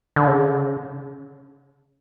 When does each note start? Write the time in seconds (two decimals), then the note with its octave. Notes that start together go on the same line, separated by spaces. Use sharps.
0.16 D3
0.27 C#3